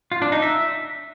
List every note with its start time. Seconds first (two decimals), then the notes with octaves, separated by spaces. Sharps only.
0.12 F4
0.22 D4
0.32 D#4
0.42 E5